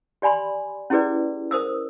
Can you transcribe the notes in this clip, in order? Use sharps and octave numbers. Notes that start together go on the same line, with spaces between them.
G4 D5 G#5 B5 C6
C#4 E4 G4 G#4 B4 D5
A#4 C5 D#6 E6